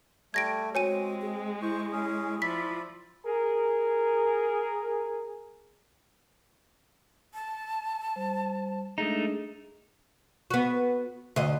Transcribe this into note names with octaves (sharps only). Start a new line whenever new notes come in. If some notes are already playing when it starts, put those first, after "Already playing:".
G3 A3 G#6 A#6 D7
G#3 C4 F#4 C#5 G#5 D#7
G#4
E4 C5 C#6
C#4 G#4
F3 D5 E5 B5 B6
G#4 A#4
A5
G3 C5
G#3 A3 D4 D#4 G#4
B3 F#4
D2 D#5